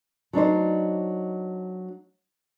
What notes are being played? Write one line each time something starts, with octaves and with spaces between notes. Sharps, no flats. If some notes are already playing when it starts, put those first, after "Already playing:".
F#3 D4 D#4 C5